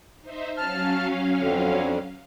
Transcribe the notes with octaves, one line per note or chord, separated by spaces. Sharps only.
D#4 C5 E5
F#3 C#4 F5 A5 F6
F2 D3